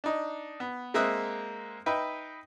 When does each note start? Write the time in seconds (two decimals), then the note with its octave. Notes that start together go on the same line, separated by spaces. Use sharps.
0.04 D4 D#4
0.60 B3
0.94 G#3 A#3 C4 E5 D#6 F#6
1.86 D#4 B4 E5 G5